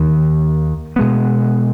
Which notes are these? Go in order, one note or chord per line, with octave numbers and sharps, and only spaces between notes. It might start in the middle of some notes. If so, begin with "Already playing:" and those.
Already playing: D#2 D#3 A#3
B2 G#3 B3